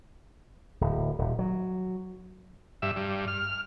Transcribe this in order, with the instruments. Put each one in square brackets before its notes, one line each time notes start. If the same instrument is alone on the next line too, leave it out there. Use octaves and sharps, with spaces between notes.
[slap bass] D1
D#1
F#3
[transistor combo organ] G2 E5
G2
F6